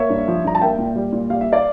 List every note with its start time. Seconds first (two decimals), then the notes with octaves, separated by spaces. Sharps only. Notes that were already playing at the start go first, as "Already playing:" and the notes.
Already playing: A#3 C#5 E5
0.10 G2
0.28 F3
0.44 G2 A#5
0.55 A5
0.61 A#3 E5 G5
0.78 A#2
0.96 G3
1.12 A#2
1.30 G3 F5
1.41 E5
1.52 D5 F5